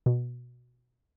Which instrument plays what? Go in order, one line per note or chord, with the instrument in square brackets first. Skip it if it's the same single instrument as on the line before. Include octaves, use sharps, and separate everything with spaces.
[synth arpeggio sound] B2